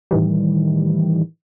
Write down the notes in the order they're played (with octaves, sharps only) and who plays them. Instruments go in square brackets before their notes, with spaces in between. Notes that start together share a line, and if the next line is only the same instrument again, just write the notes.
[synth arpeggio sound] A2 D#3 E3 G3